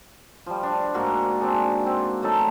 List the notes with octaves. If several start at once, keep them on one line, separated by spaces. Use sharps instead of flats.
F3 G3
D4
G#2 A#3 F#4
C4 D4 G#4
C4
F#3 A3 D#4 A4